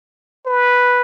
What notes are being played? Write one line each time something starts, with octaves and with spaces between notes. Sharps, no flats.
B4